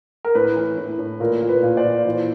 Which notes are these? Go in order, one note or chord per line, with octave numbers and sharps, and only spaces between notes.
A#4
A2 B4
E3
A2
A2
A#2 A#4
A#2
B4
A#2
C5 D5
A#2
E3